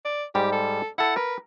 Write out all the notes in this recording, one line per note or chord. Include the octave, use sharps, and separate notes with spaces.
D5
G#2 G3 G4
A4
E4 A4 F#5
A#4 B4